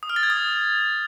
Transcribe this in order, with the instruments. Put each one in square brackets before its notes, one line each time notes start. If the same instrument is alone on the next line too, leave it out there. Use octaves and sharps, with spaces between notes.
[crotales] D#6
F6
A6
G#6
D#6